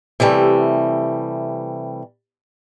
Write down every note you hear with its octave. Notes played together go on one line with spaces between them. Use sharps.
C3 E3 G3 A3